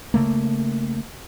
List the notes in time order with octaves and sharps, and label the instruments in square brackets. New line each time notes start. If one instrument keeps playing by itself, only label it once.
[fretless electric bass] C#3 A3 A#3